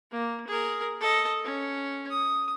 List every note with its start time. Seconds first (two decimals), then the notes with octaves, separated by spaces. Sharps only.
0.12 A#3
0.47 G#4 A#4
1.00 A4 D#5
1.44 C#4
2.10 D#6